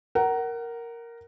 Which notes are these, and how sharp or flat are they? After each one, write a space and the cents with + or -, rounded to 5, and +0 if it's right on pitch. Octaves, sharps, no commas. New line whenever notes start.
A#4 +0 F#5 +25